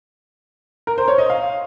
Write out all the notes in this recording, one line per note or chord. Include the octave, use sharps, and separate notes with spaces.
A#4
C5
C#5
D#5
F5